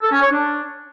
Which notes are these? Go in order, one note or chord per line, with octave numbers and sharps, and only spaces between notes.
A4
C#4
C#5
D4